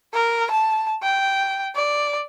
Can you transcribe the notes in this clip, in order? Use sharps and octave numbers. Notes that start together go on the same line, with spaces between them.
A#4
A5
G5
D5